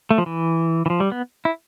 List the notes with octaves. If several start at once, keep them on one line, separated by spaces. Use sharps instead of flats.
A3
F3
E3
E3
F3
G3
B3
E4